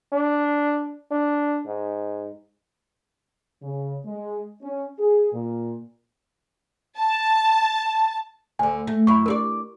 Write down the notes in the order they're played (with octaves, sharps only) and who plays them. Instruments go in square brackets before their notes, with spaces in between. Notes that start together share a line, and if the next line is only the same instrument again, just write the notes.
[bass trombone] D4
D4
G#2
[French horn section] C#3
G#3
C#4
G#4
A#2
[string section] A5
[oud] D2 D3 [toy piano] G#5
[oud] A3
[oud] F#2 E4 [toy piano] B5 C#6
[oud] D4 E4 D5 [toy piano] G4 A#4